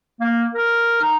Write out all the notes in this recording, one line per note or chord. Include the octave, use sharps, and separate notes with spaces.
A#3
A#4
D#4